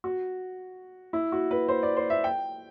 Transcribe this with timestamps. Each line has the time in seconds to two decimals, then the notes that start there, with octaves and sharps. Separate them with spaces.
0.04 F#4
1.13 E4
1.32 F#4
1.51 B4
1.68 C5
1.83 D5
1.96 C5
2.10 E5
2.24 G5